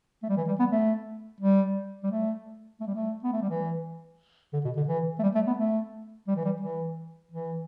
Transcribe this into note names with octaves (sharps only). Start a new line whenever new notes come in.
A3
G3
E3
G3
B3
A3
G3
G3
A3
A3
G3
A3
B3
A3
G3
E3
D3
B2
D3
E3
A3
G3
A3
B3
A3
G3
E3
G3
E3
E3